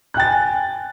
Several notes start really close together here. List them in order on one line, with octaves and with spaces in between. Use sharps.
F#6 G5 A6 G#5